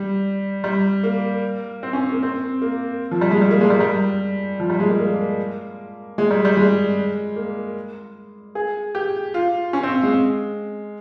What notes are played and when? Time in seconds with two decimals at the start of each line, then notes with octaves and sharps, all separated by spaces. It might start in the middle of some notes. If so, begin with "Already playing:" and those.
Already playing: G3
0.64 G3
1.04 A#3
1.83 C4
1.93 C#4
2.12 A#3
2.23 C4
2.62 A#3
3.11 F3
3.21 G3
3.31 G#3
3.41 G3
3.51 A#3
3.61 G#3
3.70 G3
3.80 G3
4.60 F3
4.70 G3
4.80 G#3
4.89 A#3
5.00 A#3
6.18 G#3
6.31 G3
6.45 G3
6.57 G#3
7.36 A#3
8.55 G#4
8.95 G4
9.34 F4
9.73 C#4
9.83 C4
10.03 G#3